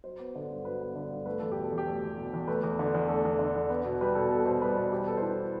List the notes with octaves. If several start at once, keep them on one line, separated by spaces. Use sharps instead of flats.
F#3 C5
B3
D3
G2
F#3 B4
B3
D3
G2
A3 B4
E2 A4
G4
B2
A4
E2
G4
A3 A4
E2
B2
E2
A3 B4
E2
D3
E2
A3 A4
E2
D3
E2
B3
B2
G3 B4
B2 A4
B3 A4
B2 C5
G3 B4
B2
G3 G4
B3 A4
C5
E3 B4